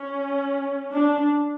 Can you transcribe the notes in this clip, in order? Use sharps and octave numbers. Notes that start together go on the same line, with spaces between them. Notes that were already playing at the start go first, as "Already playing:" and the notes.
Already playing: C#4
D4